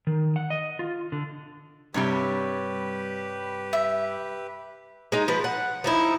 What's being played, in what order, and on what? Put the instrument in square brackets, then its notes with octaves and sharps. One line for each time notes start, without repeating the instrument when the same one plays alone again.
[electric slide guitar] D#3
F#5
D#5
F4
D3
[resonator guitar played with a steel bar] G2 C3 G3 [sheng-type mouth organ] G4 B4 [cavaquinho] C#5
[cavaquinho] E5
[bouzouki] G#3 D#4
F3 B4
F#5
F3 D#4 E4